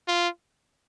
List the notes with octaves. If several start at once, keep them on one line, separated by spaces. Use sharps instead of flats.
F4